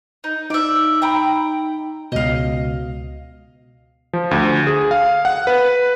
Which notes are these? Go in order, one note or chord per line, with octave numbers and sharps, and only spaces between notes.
D#4
D#4 D5 E5
G5 A#5 B5
C#2 B2 D#5 F5
F3
D2
G#4
F5
F#5
B4